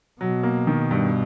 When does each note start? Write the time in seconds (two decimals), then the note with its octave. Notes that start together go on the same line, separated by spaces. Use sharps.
0.21 B2 F#3
0.43 A#3
0.67 D#3
0.91 G2